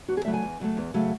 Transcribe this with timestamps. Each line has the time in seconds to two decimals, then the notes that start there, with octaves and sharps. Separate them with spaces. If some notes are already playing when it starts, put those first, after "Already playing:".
0.08 E2 F#4
0.17 G#4
0.25 C#3 F#3 A3 E5
0.34 G#5
0.42 E2
0.60 C#3 F#3 A3
0.77 E2
0.94 C#3 F#3 A3